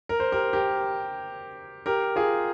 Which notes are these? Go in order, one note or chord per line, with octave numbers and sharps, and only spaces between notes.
A#4
C5
G4 A#4
G4 A#4
G4 A#4
F4 G#4